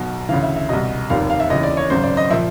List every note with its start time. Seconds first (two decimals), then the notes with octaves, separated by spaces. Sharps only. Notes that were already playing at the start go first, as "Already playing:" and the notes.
Already playing: B1 B2
0.29 D2 C#3 E3 F5
0.43 E5
0.56 E5
0.69 C2 B2 D#5
1.10 F1 D#2 D#3 F5
1.30 F5
1.40 E5
1.50 D#2 C#3 E3 D#5
1.63 D5
1.77 C#5
1.90 G#1 F#2 C#3 C5
2.03 D5
2.17 D#5
2.30 A#2 F3 E5